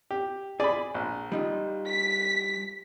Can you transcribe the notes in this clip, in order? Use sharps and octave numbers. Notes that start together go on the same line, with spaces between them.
G4
G#4 D5 B5
A#1
G3 D#4 F4
B6